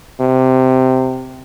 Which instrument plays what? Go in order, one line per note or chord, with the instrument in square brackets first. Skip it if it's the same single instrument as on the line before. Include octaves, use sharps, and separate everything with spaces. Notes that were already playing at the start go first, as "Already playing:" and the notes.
[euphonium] C3